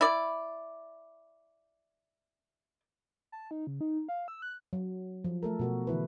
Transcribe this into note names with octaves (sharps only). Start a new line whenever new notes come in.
E4 D5
A5
D#4
C#3
D#4
F5
E6
F#6
F#3
F3
A3 A4 A#4
B2 F#4 A#4
D3 E3 E4 B4